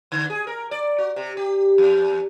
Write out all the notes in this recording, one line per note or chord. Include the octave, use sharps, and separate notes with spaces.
D3
G#4
A#4
D5
F#4
C3
G4
E2